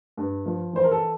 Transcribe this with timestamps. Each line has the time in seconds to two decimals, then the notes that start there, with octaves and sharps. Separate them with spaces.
0.17 G2
0.46 F3
0.73 E3 C5
0.84 A#4
0.91 A4